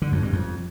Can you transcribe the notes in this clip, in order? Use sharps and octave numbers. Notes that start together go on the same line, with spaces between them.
D3
F2
G2
F2